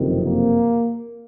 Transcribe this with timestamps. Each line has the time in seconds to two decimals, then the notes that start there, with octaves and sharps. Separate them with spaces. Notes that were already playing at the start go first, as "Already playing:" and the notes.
Already playing: F#1 F2 C3 D#3
0.25 A#3